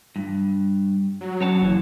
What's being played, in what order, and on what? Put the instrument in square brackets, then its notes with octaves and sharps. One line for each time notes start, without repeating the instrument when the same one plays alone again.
[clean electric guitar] G2
[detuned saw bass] F#3
[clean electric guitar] F#2 C#5 A5
[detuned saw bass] F#1 [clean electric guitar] E3